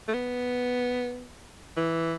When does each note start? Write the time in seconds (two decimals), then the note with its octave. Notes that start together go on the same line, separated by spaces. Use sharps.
0.08 A3
0.14 B3
1.77 E3